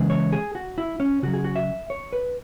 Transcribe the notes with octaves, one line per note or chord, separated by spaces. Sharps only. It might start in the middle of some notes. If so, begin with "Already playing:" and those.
Already playing: C#3 E3 G#3
C#5
G#4
F#4
E4
C#4
C#3 F#3 F#4
G#4
F#4
E5
C#5
B4